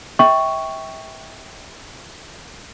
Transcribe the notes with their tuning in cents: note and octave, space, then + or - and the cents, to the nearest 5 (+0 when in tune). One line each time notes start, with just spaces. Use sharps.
E5 -30 G5 +0 C#6 +0